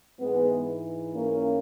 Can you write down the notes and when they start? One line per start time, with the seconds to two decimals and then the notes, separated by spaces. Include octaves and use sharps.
0.20 G#2 E3 G#3 B3
1.14 A#3 C#4